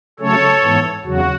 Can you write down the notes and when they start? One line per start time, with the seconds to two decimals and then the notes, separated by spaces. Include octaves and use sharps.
0.19 C#3 F#3 A3 C#4 A4 C#5
0.63 G#2 E3 B3
1.05 E2 C#3 F#3 F#4